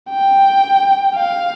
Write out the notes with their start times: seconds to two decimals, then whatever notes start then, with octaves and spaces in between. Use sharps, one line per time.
0.11 G5
1.15 F5